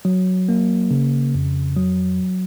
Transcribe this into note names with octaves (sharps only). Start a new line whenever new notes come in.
F#3
A#3
C#3
F2
F#3